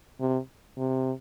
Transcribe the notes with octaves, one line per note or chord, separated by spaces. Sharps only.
C3
C3